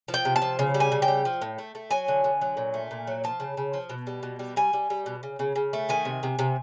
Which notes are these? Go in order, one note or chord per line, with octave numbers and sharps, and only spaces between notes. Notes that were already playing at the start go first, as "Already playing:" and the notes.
F3
G5
C3
A5
F3
C#3
G3
G#5
C#3
G5
G3
F3
A2
A3
A3
F#3 G#5
D3
D3
F#3
A#2
A3
A#2
F#3
F3 A5
C#3
C#3
F3
B2
G3
B2
G3
G3 G#5
G3
G3
B2
C#3
C#3
C#3
A3
D#3 G#5
C3
C3
C3